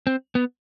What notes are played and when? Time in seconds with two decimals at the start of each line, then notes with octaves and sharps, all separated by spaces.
0.07 C4
0.35 B3